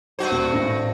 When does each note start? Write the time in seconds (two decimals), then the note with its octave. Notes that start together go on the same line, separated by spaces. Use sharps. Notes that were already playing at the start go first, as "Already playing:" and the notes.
0.19 G2 F#4 C5
0.31 D#1
0.53 G#1 A2 A#6